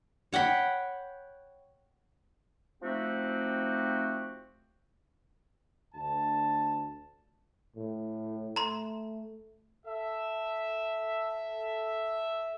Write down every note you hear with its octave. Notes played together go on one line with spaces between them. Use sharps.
C#5 F#5 G5 B5
F3 A3 C4 D#4 F#4 G4
D2 A5
A2
A3 A#5 C6
A4 E5